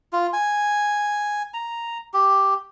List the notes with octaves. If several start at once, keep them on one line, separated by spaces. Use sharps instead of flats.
F4
G#5
A#5
G4